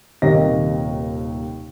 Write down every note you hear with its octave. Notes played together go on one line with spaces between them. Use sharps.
D#1 D#2 C3 A#3 D#5 A#6